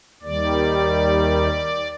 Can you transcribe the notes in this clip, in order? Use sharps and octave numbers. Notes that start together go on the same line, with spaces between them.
D#2 D#3 G3 D5